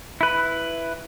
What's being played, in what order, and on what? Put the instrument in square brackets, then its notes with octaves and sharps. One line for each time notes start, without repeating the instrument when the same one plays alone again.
[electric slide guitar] E4 B4